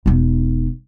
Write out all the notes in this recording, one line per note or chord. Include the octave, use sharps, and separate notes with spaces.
E1 D#4